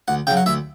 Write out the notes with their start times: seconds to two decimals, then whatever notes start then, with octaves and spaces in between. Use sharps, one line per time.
0.08 D2 F#5
0.27 C#3 F#3 G5
0.37 F#5
0.46 D2 E5